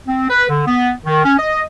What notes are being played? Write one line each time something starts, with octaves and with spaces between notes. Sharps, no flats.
C4
B4
D3
B3
D#3
C#4
D#5